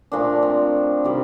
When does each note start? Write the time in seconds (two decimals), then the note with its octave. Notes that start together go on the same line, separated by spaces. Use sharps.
0.12 A#2 F3 A3 D4
0.43 C4
1.04 C3 D#3 G3